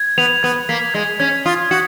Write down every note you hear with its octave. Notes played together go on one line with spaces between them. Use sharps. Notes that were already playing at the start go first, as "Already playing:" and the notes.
Already playing: G#6
B3 F7
B3 G#6
A#3 B6
G#3 G#6
C#4 G#6
F4 D#6
F#4 C#7